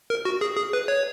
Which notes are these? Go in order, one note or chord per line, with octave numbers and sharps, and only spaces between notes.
A#4
F#4
G#4
G#4
B4
C#5